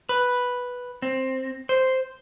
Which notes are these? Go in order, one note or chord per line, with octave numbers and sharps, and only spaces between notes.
B4
C4
C5